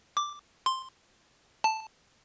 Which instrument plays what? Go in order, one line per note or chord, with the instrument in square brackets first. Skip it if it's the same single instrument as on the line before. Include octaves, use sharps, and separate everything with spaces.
[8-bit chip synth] D6
C6
A5